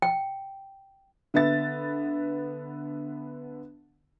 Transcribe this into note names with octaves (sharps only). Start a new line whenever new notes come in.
G5
D3 B3 E5 A6